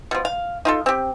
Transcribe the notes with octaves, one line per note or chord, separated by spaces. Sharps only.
B2 F3
F5
D#4 F4 A4
C4 G4